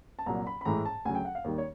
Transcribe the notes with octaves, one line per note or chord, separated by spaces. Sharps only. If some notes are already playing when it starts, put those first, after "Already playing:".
A5
C2 A#2 F#3 A#5
B5
B5
A2 E3 G#3 A#5
A5
D2 C#3 F#3 G#5
G5
F#5
F5
D#2 D#3 G3
C#5